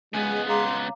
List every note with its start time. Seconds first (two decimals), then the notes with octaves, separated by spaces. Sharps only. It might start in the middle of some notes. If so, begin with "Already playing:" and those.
0.14 C#2 G#3 B3 G#5
0.49 F5 A#5 C6 D6